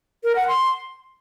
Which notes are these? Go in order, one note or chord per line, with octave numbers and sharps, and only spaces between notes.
A#4
F#5
C6